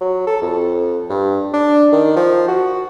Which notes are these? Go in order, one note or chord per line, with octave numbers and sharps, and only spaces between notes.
F#3
A4
F2
G2
D4
D#3
F3
F#4